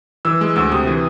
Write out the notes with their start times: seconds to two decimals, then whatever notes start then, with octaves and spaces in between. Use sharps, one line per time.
0.25 E3 E6
0.41 G#3
0.56 D2 E6
0.72 C3 D#6
0.87 E3